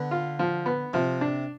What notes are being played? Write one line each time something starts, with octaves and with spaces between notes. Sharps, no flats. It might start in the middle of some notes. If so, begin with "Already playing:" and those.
Already playing: D3 B3
F4
F3
B3
C3 F3
D4